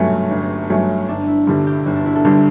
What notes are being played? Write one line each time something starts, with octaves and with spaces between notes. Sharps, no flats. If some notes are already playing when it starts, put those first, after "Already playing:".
Already playing: G1 G2 F#3 A3 C#4 F#4
G1
G2 F#3 A3 C#4
G1 D4
E4
G2 D3 G3
G4
G1 F#4
D4
E4
A4
G2 D3 G3 G4